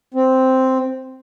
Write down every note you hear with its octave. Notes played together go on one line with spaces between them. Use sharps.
C4